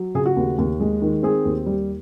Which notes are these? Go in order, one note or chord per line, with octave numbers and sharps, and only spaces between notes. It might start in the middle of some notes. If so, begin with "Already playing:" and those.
Already playing: F#3
C#3 G#4
F#4
D#2
D#2
G#3
D#3
C4 G#4
D#2
G3